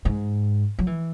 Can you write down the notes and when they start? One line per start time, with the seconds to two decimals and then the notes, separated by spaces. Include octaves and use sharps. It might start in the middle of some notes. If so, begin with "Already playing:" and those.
0.05 G#2
0.79 F#3
0.87 E3